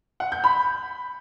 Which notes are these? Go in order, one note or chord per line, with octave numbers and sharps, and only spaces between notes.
F#5
G6
B5